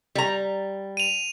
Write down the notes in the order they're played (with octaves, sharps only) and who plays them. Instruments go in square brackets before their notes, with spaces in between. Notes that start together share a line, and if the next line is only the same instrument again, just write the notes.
[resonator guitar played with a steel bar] G3 A#5
[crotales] D#7 F7